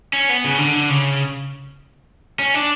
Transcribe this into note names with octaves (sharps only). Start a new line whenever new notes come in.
C#4
B3
C#3
D3
C#3
C#4
D4